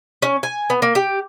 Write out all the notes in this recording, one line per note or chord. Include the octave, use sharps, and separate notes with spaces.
C#4
G#5
B3
A#3
G4